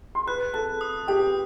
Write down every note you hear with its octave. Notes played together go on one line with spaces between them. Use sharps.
C6
B4 B5 F#6
A4 A5 F#6
D#6
G4 G5 D#6